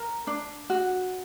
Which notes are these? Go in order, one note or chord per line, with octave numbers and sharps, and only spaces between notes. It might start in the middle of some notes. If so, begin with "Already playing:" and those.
Already playing: A#4 A#5
D4
F#4